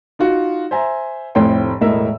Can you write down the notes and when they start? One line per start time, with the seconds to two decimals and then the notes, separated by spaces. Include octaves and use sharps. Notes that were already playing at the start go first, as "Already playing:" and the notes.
0.19 D#4 F4 F#4
0.71 C5 E5 G#5 A#5
1.35 F1 A2 C4 C#5 G5 C6
1.81 E1 A2 A#4 D#5 E5 E6